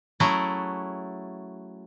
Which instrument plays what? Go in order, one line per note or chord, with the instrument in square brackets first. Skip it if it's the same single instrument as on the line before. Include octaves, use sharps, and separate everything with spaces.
[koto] F#3 A3 C#4 E4 F#4 G#4